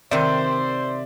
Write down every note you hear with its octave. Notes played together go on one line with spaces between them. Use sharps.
C3 D#3 C5 D5 E5